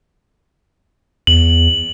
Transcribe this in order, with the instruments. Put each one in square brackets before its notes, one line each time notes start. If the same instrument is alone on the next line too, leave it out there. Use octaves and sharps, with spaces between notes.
[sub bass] E2 [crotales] F#7